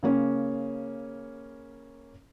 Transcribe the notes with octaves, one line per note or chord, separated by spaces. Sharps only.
C#3 A#3 C#4